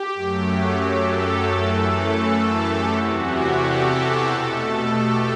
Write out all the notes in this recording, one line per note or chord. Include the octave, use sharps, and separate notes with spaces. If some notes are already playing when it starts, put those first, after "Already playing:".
Already playing: G4
F#2 F#3 A3
A4
F#2 E3 A3
A4
G4
E2 C3 E3 F#4
G4
A4
B2 A3
G4